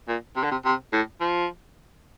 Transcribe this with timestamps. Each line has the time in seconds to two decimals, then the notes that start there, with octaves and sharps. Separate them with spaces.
0.08 A#2
0.36 C3
0.43 D3
0.51 C3
0.65 C3
0.93 A2
1.21 F3